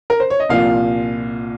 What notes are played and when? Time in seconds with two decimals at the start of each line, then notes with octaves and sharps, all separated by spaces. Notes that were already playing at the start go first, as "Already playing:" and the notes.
0.10 A#4
0.20 C5
0.30 C#5
0.40 D#5
0.49 C2 A#2 F3 F5